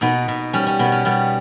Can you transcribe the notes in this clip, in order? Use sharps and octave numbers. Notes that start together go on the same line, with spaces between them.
B2 B3 D#4
B2
G3 C#4
C#4
B2 B3
C#4
G3 B3